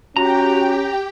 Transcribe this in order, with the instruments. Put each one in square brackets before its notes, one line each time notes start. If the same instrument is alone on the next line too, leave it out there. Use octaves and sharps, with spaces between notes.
[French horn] C#4 [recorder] F#4 [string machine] G4 G5 [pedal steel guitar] A#5